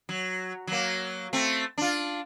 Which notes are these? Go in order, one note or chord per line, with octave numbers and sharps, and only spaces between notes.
F#3
F#3 A#3
A3 C4
D4 F4